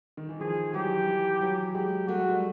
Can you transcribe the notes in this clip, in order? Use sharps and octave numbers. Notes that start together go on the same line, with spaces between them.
D#3
E3
D#3 F3 G#4
E3 F#3 G4
E3 F#3
E3 F#3
F#3 G#3 G4
A3 F#4
G#3
G3 A3